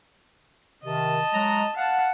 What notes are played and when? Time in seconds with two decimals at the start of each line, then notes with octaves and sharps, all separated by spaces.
0.85 C3 D#3 D#5 A5
1.34 F#3 G#3 A#5
1.76 F5 F#5 A5